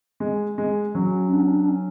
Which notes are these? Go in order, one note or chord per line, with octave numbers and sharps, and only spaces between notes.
G#3
G#3
F#3 C#4
D4
C#4
D4
D4
C#4